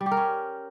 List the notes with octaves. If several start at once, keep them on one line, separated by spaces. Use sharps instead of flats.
G3
G4
A#4
C#4